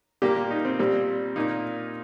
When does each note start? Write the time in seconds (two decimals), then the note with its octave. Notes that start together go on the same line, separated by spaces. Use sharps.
0.22 A#2 G3 A#3 G4
0.51 D#4
0.65 C4
0.79 A#2 G3 C4
1.36 A#2 A#3 D#4